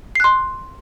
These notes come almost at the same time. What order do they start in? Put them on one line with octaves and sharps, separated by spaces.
C7 F#6 C6